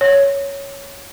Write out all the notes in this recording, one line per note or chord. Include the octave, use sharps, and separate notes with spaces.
C#5